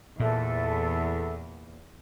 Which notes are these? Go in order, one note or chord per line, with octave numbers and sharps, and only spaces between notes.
E2 A#2 A4 E5